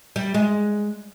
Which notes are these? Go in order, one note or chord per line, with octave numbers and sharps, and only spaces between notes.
G3
G#3